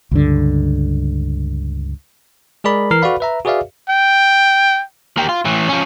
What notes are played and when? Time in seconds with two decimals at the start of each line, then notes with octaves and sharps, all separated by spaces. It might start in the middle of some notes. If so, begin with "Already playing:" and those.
0.11 C#2 G2 D3
2.64 G#3 G#4 A#4 D5 B5
2.91 E3 A#4 F6 C7
3.02 F#4 A4 B4 D5 F5 B5
3.20 B4 E5 A#5
3.45 F#4 G#4 B4 D5 E5 F5
3.89 G5
5.17 A#3 G4
5.29 F4
5.45 A2 E3
5.68 F3 C#4